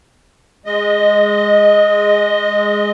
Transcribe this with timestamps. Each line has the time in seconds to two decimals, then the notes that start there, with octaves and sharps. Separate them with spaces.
0.66 G#3 D#5